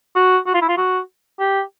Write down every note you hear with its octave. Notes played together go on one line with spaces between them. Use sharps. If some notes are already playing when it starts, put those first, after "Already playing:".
F#4
F#4
F4
E4
F4
F#4
G4